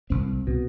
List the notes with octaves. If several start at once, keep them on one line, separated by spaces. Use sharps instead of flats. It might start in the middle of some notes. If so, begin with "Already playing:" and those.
C2 C4
B2